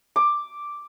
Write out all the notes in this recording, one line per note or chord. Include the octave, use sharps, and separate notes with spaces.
D6